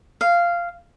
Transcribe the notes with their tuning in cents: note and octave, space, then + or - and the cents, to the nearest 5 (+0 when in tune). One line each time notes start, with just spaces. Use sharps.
F5 -10